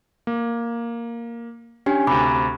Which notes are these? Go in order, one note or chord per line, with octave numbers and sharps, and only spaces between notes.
A#3
C#4 D4 G4 G5 G#5
D2 C3 B5 D6